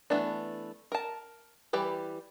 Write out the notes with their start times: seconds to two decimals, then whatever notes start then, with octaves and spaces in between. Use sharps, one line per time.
0.10 E3 A3 B3 D4
0.92 A#4 A5
1.73 E3 G3 G4 B4